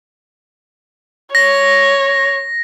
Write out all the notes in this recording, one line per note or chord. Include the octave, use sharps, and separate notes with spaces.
C#5 A#6